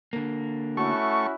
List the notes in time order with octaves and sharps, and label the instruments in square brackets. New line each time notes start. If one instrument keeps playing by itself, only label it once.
[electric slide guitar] D3 A#3
[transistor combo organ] A3 C#6 [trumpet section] C#4 E4 F#4